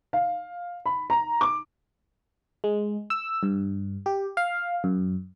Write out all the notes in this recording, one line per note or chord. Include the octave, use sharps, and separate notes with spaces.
F5
B5
A#5
D6
G#3
E6
G2
G4
F5
F#2